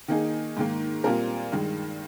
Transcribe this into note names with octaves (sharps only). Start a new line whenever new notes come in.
D#3 A#3 D#4 G#4
G#2 D#3 A#3
A#2 G3 C4 F4 A#4
G2 D#3 G#3